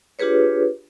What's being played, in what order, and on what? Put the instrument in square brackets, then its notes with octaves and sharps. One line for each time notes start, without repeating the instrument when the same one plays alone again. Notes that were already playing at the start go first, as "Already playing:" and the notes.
[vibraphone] D4 F4 G4 G#4 B4 C#5